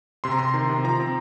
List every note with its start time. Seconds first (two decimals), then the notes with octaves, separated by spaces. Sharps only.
0.24 C3 C6
0.31 A#5
0.39 C3 C6
0.54 D#3
0.69 C3
0.84 F3 A#5
1.00 C4